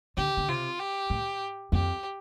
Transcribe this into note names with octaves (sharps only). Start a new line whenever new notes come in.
D3 G4
D3
C3 F4
G4
A2
F2 G4